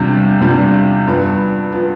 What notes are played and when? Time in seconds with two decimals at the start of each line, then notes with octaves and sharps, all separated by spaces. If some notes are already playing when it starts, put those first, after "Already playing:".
Already playing: E2 C3 G3 D4 F4
0.41 E2 C3 G3 D4 F4
1.07 G2 F3 B3
1.72 F3 B3